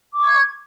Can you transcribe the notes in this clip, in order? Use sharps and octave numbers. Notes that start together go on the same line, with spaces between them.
C#6 D6 G#6